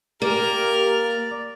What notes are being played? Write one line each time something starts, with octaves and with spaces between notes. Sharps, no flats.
A#3 G4 A#4 D5 F7